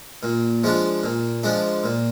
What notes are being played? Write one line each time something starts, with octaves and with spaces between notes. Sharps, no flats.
A#2
F3 G#3 D4
A#2
F3 G#3 D4
A#2